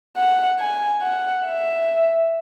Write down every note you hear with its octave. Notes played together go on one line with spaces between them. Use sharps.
F#5
G#5
F#5
E5